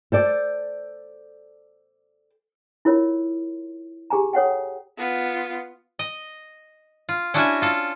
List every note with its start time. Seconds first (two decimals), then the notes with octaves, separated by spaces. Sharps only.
0.12 A4 C5 D5
2.85 E4 F4 A#4 C#5
4.10 G4 G#4 G#5 A#5
4.33 A4 C#5 F#5 G5
4.98 B3 F4
5.99 D#5
7.09 F4
7.34 C#4 D4 E4 F#4 E5 G#5
7.62 F4 A4